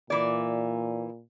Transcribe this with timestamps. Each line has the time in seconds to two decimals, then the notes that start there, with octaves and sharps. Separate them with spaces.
0.10 A#2 E3 D5